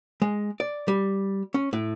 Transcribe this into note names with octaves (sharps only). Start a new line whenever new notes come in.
G#3
D5
G3
C#4
A2